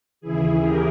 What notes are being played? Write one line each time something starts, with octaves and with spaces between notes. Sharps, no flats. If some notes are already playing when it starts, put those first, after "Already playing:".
D#2 C#3 E3 E4 G#4
G4 A#4